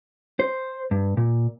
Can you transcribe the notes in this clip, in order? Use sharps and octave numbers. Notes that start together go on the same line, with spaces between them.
C5
G2
A#2